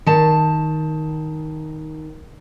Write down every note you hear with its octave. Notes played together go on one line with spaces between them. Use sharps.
D#3 A5